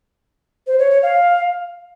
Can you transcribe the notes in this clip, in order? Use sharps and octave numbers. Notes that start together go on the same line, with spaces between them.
C5
C#5
C#5
F5